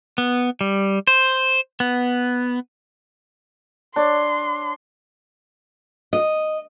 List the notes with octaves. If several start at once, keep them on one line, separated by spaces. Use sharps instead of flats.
B3
G3
C5
B3
D4 C#5 C6
D#5